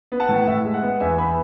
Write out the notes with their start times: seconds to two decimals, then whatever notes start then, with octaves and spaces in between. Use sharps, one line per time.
0.12 B3
0.20 F#5 A5
0.29 A2
0.47 A2 E5
0.65 G#3
0.74 F#5
0.82 B3
1.00 E2 E5 G#5
1.18 B3 G#5 B5